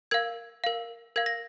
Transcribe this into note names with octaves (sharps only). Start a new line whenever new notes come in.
A#4 F5 G#6
A#4 F5
A#4 F5 G#6
A#6